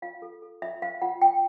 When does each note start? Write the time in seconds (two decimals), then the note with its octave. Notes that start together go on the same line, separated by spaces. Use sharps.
0.02 F4 F5
0.22 A4
0.42 A4
0.62 F4 E5
0.82 C5 F5
1.02 F4 F#5
1.22 F4 G5